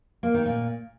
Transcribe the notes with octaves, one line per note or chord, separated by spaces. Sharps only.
A#3
D#3
A#2